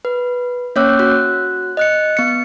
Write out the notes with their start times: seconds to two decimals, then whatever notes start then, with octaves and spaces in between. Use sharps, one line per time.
0.05 B4
0.76 A#3 C#4 C#5 D6 E6 F#6
0.99 F#4 F#6
1.77 D#5 F#6 C#7
2.17 B3 C#7